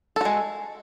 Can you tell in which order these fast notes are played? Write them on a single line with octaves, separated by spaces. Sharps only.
A4 F#4 G#3